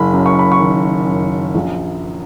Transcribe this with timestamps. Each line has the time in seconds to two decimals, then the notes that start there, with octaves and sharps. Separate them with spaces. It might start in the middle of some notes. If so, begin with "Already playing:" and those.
Already playing: F#1 B5
0.13 F#2
0.26 C#6
0.39 B5
0.52 C#6
0.60 D#3
1.07 F#2
1.55 A#1